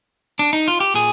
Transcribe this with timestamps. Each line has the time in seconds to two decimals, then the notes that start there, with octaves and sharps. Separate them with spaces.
0.39 D4
0.53 D#4
0.68 F4
0.80 G4
0.94 A#2 G#4